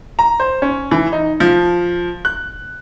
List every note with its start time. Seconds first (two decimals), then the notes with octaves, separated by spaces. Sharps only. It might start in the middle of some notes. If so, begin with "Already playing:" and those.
0.19 A#5
0.40 C5
0.62 C#4
0.91 E3
1.12 D#4
1.40 F3
2.25 F#6